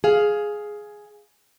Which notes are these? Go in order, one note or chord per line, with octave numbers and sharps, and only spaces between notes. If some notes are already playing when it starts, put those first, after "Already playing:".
G#4 F5